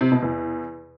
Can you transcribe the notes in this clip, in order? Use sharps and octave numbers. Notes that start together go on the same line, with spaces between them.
C3
B2
E2